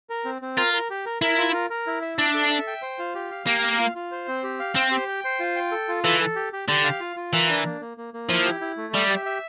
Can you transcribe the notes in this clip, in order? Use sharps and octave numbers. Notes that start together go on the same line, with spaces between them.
A#4
C4
C4
F4 A#4
A#4
G4
A#4
E4 A#4
F4
A#4
A#4
E4
E5
D4 E5
A4
E5
G5
C5
F4
G4
F5
A#3 G4
F5
F4
F4
C5
C4
G4
F5
C4 C5
G4
G5
C5
F4
G5
A4
F4
E3 A4
A4
G4
G4
D3 G4
F5
F4
F4
E3 A#4
D4
A#3
A#3
A#3
A#3
F3 E4
G4
E4
A3
G3 E5
G4
E5